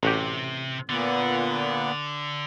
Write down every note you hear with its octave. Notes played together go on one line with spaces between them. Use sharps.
A1 C3 F#4 G4
A#2 D3 B3